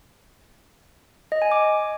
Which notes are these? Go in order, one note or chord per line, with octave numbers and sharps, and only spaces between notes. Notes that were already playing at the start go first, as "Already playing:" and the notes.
D#5
G#5
D6